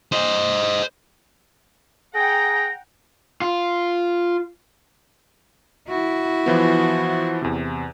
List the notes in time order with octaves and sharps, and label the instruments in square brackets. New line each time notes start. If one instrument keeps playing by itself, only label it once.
[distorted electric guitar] C5 D#5
[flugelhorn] G#4 [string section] F#5 G5 A#5 [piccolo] A#6
[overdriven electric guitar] F4
[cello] E4 F#4
[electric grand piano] E3 F3 B3
E2 C3